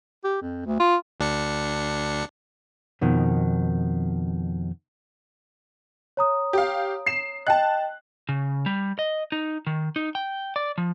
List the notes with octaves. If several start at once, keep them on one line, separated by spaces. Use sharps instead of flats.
G4
F2
D2
F4
D2 D4 C#7
F2 B2 D#3
C#5 A#5 D#6
G4 F5
C7 E7
D#5 G5 A5 F#6
C#3
G3
D#5
D#4
D#3
D#4
G5
D5
F3